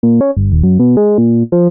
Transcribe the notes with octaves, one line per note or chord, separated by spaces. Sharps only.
A#2
C#4
G1
D#1
F#2
B2
G#3
A#2
F3